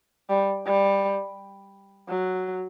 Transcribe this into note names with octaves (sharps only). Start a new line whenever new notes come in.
G3
G3
F#3